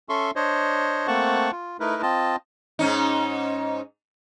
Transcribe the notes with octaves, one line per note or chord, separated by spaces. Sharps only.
C#4 A4 E5 C6 C#6
D4 C5 C#5 D#5
A3 A#3 C4 F#5 A5 C#6
F4
A3 D#4 E4 A#4 B4
C4 F4 D#5 A5
G#2 C#4 D#4